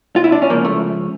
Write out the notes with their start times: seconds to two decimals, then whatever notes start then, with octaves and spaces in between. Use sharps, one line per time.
0.16 F4
0.24 E4
0.32 D4
0.42 C#4
0.50 C#2 C#3 F3 A#3
0.65 A3